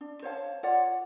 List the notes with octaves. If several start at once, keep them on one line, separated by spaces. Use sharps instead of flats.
D4
C5 C#5 F5 A5
F4 C#5 D5 F#5